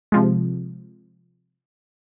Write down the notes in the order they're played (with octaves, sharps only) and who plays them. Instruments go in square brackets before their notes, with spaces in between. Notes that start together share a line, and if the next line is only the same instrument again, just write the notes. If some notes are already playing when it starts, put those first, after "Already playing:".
[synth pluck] C3 F3 G#3